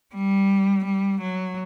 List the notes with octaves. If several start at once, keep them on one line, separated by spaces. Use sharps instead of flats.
G3
G3
F#3